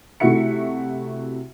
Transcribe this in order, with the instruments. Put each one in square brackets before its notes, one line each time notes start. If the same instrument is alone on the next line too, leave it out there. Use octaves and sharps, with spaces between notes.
[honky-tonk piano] C3 A3 E4 F#4 E5 C#7